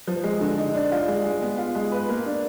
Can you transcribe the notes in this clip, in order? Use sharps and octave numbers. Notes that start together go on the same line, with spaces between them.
F3
G#3
D3
D#4
D4
F4
G#3
G#3
B3
F4
G#3
B4
A#3
D4